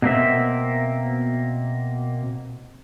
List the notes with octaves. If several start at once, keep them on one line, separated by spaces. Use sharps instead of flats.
B2 A#3 C4 E5